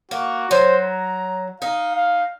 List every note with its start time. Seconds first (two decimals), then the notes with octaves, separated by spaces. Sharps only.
0.11 A#3 F#4
0.51 F#3 C5
0.84 A#5
1.62 D#4 F5
1.95 F5